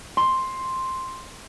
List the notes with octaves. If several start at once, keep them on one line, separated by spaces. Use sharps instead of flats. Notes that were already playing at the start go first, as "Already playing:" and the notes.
C6